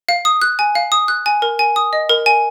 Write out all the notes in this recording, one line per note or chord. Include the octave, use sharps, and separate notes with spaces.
F5
D#6
F#6
G#5
F5
D#6
F#6
G#5
A#4
G#5
D#6
D#5
A#4
G#5